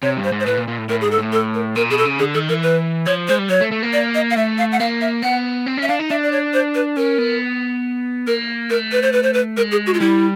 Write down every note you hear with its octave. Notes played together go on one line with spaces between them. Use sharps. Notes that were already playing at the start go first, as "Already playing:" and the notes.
C3 C#5
G2
C5
G#2
C5
A2 B4
A#2
A#2
A2
A2 A#4
G#2 G#4
A4
A2
A4
A#4
A#2 A#4
B2 G#4
A4
C#3
D3 G#4
D#3 A4
E3 A#4
B4
F3 C#5
G#3 C5
G3
F#3 C#5
A3
A3
A#3
D5
D#5
F5
A3 E5
F5
F#5
A#3 F5
E5
B3 F#5
C4
C#4
E5
D4 F5
D#4
D4 E5
D5
C#5
C5
B4
C#4 A#4
B3
A#3 A#4
A3 A#4
B4
C5
B4
C5
B4
G#3 A#4
G#4
F#4
F4
G3 E4